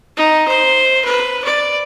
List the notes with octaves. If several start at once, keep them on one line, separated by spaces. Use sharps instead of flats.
D#4
C5
B4
D5